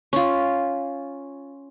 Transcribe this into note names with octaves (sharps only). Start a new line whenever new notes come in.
C#4 F4